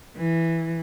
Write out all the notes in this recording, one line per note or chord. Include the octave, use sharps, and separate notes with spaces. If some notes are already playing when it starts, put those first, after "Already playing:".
E3